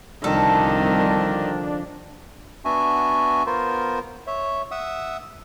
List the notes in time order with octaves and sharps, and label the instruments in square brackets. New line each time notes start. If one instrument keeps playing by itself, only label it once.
[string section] C2 [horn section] D3 F3 D4 [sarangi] D#3 [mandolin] A4
[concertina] B3 D4 F#4 E5 G#5
B3 F4 A#4 C5
C#5 E5
E5 F#5 D#6 E6